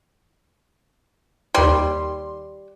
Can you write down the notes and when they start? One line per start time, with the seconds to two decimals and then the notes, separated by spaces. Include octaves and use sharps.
1.55 D#2 G3 C6